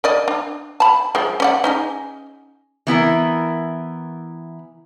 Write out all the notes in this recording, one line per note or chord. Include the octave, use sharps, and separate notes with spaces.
A#4 D5 D#5
D4
A5 B5
F3 G#3
C#4 D5 F#5
C#4 D#4 G#4
E3 B3 E4 A#4